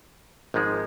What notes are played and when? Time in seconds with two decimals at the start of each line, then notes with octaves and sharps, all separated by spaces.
0.54 G#1 G#2 F3 G#3